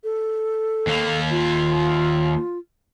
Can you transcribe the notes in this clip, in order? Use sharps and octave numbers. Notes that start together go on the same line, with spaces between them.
A4
D#2 A#3
F4